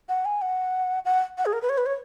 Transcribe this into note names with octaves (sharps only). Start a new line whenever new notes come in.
F#5
G#5
F#5
F#5
F#5
G#4
A#4
B4
C#5
B4
C#5